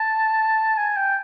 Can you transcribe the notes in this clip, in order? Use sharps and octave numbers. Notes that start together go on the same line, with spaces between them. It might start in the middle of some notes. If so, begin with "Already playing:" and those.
Already playing: A5
G#5
G5